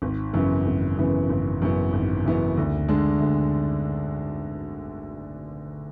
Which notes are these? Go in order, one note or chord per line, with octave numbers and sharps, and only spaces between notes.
G#1
F#2 C#3 E3 B3
G#1
F#2 C#3 E3 B3
G#1
F#2 C#3 E3 B3
G#1
F#2 C#3 E3 B3
D2
D3 G#3 D4
D2